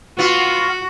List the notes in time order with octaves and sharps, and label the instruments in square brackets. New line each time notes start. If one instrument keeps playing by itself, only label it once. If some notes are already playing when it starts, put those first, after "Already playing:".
[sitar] B3 F4 [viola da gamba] F#4